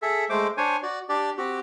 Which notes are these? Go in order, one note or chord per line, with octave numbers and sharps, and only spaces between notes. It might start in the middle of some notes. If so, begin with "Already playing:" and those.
G#4 A4 E5
G#3 A3 C5 D6
D4 C5 C#5 G#5
F#4 D5
D4 G4 D5
C4 F#4 G4